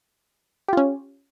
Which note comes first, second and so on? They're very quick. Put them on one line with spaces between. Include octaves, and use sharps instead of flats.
G4 F4 C#4